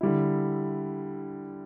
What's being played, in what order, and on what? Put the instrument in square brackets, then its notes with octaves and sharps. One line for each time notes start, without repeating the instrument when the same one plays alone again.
[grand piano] D3 G3 E4